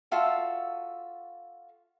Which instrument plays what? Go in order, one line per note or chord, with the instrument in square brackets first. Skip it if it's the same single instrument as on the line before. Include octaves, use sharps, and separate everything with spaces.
[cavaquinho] F4 F#4 A4 E5